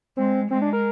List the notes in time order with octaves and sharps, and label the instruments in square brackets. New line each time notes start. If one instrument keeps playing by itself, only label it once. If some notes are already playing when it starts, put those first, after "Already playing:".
[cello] G#3 [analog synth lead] C4
[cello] G#3 [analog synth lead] C4
[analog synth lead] D4
A#4